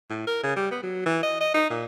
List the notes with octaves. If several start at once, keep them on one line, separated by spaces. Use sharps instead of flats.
A2
A#4
C#3
G3
B3
F#3
E3
D#5
D#5
D#4
A#2